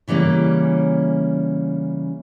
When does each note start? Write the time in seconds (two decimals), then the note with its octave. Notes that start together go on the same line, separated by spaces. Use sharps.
0.08 C#3 E3 G3 A#3 C#4